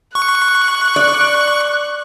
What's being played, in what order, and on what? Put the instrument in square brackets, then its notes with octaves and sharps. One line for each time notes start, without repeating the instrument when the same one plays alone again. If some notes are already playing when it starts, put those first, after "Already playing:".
[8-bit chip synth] C#6 [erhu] F#6
[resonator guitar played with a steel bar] D5